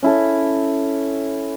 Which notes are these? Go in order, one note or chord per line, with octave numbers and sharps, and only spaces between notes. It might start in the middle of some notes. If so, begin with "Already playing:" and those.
C#4 E4 A4